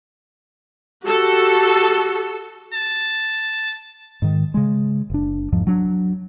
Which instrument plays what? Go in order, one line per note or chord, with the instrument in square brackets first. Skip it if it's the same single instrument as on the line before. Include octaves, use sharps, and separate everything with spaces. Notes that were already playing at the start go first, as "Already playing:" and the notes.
[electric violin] F#4 G4 [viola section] A4
[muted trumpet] A5
[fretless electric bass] G#2 D#3
C#3 G#3
F#1 D4
E2 G#2 F3
F#3 D4